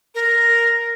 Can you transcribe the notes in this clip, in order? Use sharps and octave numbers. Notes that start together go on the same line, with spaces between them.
A#4